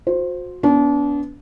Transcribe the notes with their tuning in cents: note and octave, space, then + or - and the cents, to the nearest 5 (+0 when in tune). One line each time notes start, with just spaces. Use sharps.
F#4 -40 C5 +0
B3 +0 D4 -35